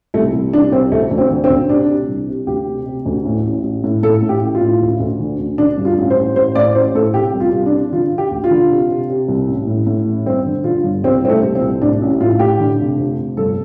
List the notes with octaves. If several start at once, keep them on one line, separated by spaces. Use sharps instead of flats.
C2 A3
C2
C2 D4
C2 C4
D2 A3
D2
C4
D3
C4
D2
C3 D4
C3
C2
C3
D2 G4
C3
C3
D2
A2
A1
A1
A2
A2 A4
A2
G4
A1
F4
A2
D2
D2
D3
D2
D3 D4
G2
F4
A1
C5
A1
A1 C5
A2 D5
A1 C5
A2 A4
C3 G4
C2
F4
C2
D4
C3
D3 F4
D3
G4
D2
F4
D3
C3
C3
C3
C2
A1
A2
A2
A1
G1 C4
D3
D3 F4
G1
C2 C4
C2 C4
A3
C2
C4
C2
A2 D4
A1
A2 F4
A2 G4
D3
F1
F2
F1
G1 A4